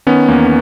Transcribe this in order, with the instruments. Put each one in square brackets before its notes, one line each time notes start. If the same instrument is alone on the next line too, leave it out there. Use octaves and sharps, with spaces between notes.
[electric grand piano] D#3 B3 C#4
E2 A#3